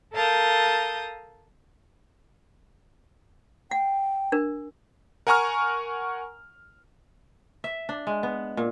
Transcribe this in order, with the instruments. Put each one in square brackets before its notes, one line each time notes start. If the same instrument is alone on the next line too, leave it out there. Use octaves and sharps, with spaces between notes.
[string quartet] A4 A#4 F5 A5 D#6 G6
[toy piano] F#5 [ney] G5
[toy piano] D4 A#4
[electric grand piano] A#4 F#5 G#5 A#5 C#6 F6
[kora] E5
D4
G#3
B3
A#2